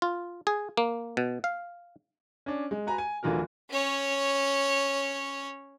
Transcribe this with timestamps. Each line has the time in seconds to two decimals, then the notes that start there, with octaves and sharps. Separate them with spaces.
0.02 F4
0.47 G#4
0.77 A#3
1.17 B2
1.44 F5
2.46 C#4 D4
2.71 G#3
2.86 F#4 B4 G#5 A#5
2.98 G#5
3.23 D1 D3 E3 F4 F#4 A#4
3.70 C#4 C#5